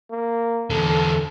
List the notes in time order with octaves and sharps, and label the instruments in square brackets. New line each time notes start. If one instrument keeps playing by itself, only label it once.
[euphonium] A#3
[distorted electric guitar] E2 D3 [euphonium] A4